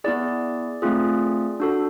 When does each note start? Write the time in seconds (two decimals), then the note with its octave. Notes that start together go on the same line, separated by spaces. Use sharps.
0.04 B3 E4 G#4 D5
0.82 A3 C4 F4 G#4
1.60 D4 F#4 A4